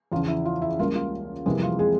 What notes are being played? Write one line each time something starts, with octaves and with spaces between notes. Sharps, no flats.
E2 C#3 F3 F4
E4
F4
E4
C#2 C#3 G3 A#3 C#4 F4
F4
F2 C3 E3 G3 G#3 A#3 G#4
F4
G#3 G#4